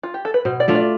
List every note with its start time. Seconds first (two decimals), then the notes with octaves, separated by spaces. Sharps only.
0.03 F4
0.14 G4
0.25 A4
0.34 B4
0.45 B2 C5
0.60 D5
0.68 A3 D4 F4
0.75 D5